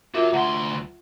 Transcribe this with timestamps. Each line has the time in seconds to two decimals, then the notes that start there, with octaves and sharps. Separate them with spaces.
0.14 F4 F#4 A#4 E5
0.33 D2 F#5 A#5 C6